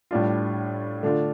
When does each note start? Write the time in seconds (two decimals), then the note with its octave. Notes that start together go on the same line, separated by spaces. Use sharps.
0.11 A2 G3 D4 F4
1.03 D3 A3 D4 F4